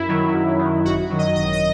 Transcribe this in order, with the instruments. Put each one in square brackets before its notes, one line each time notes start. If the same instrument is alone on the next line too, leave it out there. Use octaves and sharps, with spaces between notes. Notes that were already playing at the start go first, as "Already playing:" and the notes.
Already playing: [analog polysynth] F#2 E4
D#3 F#3
F#2
D#3 F#3
G#1 F#4
F#2 D#3 F#3
D#5
G#1 D#5
D#5